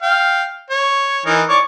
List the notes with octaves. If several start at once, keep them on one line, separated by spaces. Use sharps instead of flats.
F5 G5
C#5
E3 D#4 A#4
C#5 D5 C#6